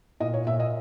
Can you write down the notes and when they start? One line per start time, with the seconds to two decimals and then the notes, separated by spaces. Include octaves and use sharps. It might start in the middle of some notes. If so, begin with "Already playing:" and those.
0.20 A#2 D#5
0.34 C#5
0.47 A#2 E5
0.60 D#5